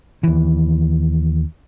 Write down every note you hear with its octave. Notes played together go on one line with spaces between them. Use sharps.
D#2 E3